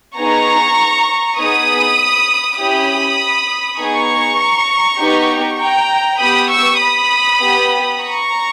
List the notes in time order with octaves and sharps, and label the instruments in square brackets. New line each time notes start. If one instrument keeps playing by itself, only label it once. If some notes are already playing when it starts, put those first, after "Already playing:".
[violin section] B3 D#4 G#4 A#5 C#6
B3 D#4 G#4 B5 D#6
C#4 E4 G4 B5 D#6
B3 D#4 G#4 A#5 C#6
B3 D#4 G4
G5 A#5
B3 G4 B5 D#6
C#6 E6
B5 D#6
B3 G4
A#5 C#6